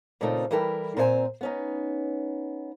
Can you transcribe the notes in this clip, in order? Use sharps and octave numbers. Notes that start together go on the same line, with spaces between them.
A#2 C#3 A3 C4 D#4 F4
E3 G3 E4 A4 A#4 G5
A#2 C4 C5 C#5 G#5 A#5
B3 C#4 D#4